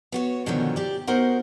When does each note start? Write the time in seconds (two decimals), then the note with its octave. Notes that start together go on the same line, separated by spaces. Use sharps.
0.12 B3 F#4 C#5
0.46 B2 D3 D#3 F3 F#3 C#4
0.76 G4 D5
1.07 B3 D#4 F#4 A#4 C5 F#5